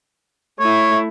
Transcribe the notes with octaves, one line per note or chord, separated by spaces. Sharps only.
A3 E4 C#5